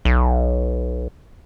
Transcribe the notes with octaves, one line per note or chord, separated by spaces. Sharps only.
B1